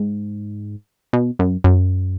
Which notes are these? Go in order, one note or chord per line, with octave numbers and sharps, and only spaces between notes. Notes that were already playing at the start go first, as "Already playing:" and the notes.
Already playing: G#2
B2
F#2
F#2